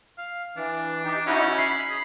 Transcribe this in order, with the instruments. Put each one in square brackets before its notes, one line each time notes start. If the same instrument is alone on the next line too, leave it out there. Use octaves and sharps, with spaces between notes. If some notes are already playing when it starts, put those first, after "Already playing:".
[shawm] F5
[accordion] E3 [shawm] D4
[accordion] D#4 G4
[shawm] C#4 [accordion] D#4 E4 F#4
[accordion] B5 [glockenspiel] C7
[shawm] G#4